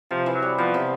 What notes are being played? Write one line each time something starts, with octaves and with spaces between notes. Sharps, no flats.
C3 F3
E3
F#3
G3
F3 B3
C3